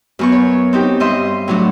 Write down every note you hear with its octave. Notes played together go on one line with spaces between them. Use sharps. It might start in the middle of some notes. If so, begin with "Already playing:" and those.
F#2 B3 C#6
C#5
C4 D#4 G4
G2 D#5 E5 C6
A2 F#3 D4